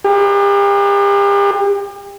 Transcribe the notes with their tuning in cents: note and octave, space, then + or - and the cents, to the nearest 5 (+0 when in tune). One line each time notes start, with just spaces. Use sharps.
G4 +40